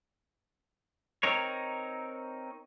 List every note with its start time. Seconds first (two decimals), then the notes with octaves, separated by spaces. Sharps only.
1.23 C4 D#4 A#4 C#5